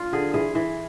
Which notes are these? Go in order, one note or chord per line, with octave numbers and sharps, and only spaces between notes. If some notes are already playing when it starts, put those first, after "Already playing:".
Already playing: D4 F4
D3 G#4
E3 G#4
E3